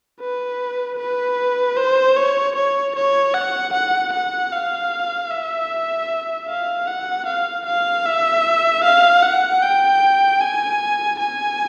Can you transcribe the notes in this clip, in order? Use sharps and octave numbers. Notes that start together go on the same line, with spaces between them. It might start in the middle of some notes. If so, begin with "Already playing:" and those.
B4
B4
C5
C#5
C#5
C#5
F#5
F#5
F#5
F5
E5
F5
F#5
F5
F5
E5
F5
F#5
G5
G#5
G#5